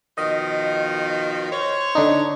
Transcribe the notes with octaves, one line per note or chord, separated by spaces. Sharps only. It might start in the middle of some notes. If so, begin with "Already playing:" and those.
B2 D#3 F3 D#5
C5 C#5
D3 D4 D#4